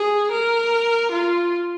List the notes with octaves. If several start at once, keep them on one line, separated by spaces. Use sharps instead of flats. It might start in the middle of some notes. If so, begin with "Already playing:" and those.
Already playing: G#4
A#4
F4